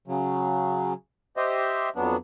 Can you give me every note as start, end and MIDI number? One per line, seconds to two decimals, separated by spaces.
0.08 0.93 49
0.08 0.93 54
1.37 1.89 67
1.37 1.89 72
1.37 1.89 75
1.37 1.89 76
1.96 2.16 41
1.96 2.16 54
1.96 2.16 59
1.96 2.16 62